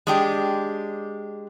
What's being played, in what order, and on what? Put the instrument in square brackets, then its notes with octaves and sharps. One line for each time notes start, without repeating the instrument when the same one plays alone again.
[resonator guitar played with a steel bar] G#3 D4 G4